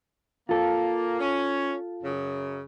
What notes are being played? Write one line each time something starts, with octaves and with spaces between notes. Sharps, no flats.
A#3 F4 A4
C#4
F#2 C#3